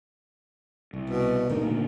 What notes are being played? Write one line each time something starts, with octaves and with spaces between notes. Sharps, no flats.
C2
B2
E1 A2 D3 D#3
A#2 D3 A3